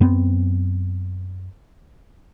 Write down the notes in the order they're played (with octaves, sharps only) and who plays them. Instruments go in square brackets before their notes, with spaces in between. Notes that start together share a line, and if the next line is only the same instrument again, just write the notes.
[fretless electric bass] F#2 B3 C4